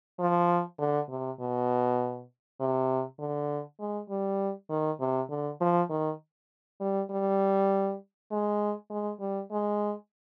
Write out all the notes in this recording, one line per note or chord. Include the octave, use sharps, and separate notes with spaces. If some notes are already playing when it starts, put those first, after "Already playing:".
F3
D3
C3
B2
C3
D3
G#3
G3
D#3
C3
D3
F3
D#3
G3
G3
G#3
G#3
G3
G#3